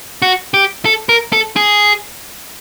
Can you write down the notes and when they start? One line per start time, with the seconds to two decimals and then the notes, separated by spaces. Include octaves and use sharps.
0.22 F#4
0.54 G4
0.85 A4
1.09 A#4
1.33 A4
1.56 G#4